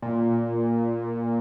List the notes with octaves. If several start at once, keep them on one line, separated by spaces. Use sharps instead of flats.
A#2